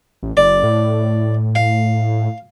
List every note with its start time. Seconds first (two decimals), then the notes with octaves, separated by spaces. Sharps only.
0.23 A1
0.37 F#1 D5
0.63 A2
1.55 F5